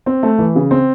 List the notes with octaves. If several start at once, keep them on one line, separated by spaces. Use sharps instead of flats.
C4
A3
E3
C#3
C4